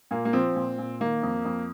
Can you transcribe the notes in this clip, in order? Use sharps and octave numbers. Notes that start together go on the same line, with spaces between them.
A#2 A#3
A#3
F3 C4
A#2
A#2
D#3 A#3
F2
F2